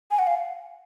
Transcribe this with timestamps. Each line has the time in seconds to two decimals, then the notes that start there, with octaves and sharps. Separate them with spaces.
0.11 G#5
0.19 F#5
0.27 F5